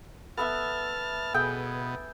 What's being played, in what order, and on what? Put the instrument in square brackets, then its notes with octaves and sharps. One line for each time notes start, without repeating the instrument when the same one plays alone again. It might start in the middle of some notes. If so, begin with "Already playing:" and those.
[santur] B3 A4 E5 [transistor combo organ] A5 F6
[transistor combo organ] B2 [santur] G#4 A4 G5